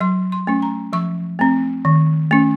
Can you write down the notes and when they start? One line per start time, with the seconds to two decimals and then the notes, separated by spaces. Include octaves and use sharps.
0.01 F#3 C6
0.32 C6
0.47 A3 C#4
0.62 A#5
0.93 F3 C#6
1.39 A3 C4
1.85 D#3
2.31 A3 C#4